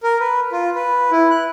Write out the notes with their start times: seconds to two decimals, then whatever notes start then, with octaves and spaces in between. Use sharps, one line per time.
0.03 A#4
0.20 B4
0.52 F4
0.75 B4
1.11 E4
1.31 F#6